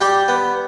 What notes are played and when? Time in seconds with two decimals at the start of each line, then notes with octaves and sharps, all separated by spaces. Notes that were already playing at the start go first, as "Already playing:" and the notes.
0.01 G3 G4 G5
0.28 B3